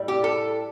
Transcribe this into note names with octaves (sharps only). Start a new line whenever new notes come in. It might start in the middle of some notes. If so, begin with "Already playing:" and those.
Already playing: A2 G3
G4
A4